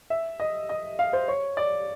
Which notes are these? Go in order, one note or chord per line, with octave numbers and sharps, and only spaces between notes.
E5
D#5
D#5
F5
C5
C#5
D5